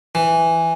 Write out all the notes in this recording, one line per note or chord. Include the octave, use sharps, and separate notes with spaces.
E3